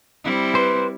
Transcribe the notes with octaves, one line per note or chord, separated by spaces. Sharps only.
G3 C4 E4
B4 C5